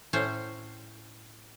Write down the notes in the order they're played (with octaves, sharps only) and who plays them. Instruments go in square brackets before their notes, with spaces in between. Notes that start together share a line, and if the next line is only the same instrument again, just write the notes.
[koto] A2 C#4 C5